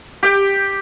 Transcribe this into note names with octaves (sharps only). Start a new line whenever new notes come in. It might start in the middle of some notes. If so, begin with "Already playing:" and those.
G4 G5